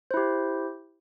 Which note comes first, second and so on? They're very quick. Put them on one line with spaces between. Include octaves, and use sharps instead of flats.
C5 E4 G4